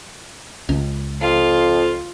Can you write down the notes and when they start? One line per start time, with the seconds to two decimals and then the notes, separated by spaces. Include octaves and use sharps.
0.69 C#2
1.21 F2 F4